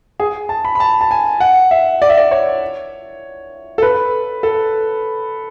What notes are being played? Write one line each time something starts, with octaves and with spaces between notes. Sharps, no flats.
G#4
A5
B5
B5
A5
A5
G#5
F#5
E5
D5
E5
D5
C#5
A4
B4
A4